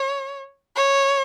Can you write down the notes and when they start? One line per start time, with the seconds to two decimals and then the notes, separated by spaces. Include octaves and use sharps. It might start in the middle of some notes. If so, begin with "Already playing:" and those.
Already playing: C#5
0.76 C#5